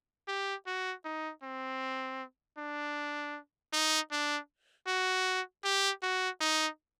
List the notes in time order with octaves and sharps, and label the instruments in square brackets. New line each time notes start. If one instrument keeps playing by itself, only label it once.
[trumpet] G4
F#4
D#4
C4
D4
D#4
D4
F#4
G4
F#4
D#4